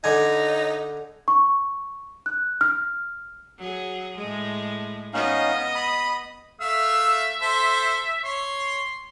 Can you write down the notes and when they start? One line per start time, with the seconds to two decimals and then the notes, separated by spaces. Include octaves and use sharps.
0.04 D3 D#4 G#5
1.28 C#6
2.26 F#6
2.61 F6
3.58 F#3 G#4
4.18 A2 G#3
5.14 B3 C#4 D#4 D#5 F5
5.75 B5 D#6
6.61 A3 E5 F5 E6
7.42 A4 C5
8.24 C#5 C6